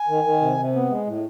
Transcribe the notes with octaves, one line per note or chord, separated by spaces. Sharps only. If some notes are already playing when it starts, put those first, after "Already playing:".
Already playing: G#5
D#3
D#3
C3
C3
B3
G#3
A2